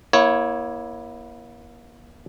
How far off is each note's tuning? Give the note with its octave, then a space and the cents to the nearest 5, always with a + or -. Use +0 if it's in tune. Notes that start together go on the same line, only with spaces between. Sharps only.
A#3 +40 E4 +0 C#5 +0